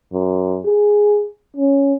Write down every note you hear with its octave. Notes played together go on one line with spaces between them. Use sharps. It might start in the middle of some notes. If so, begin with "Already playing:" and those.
F#2
G#4
C#4